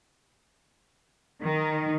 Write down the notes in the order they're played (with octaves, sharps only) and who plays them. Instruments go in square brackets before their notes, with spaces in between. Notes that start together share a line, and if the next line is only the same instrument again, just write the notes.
[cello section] D#3